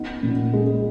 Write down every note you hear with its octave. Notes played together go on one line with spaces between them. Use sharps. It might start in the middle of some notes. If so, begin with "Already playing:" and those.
Already playing: B3 D#4
A#2
G#3